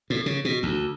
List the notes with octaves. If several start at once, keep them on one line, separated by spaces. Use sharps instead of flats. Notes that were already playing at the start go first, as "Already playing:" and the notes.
A2
C#3
B2
D2